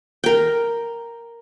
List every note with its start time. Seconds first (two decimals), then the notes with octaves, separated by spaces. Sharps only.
0.24 A#4 G5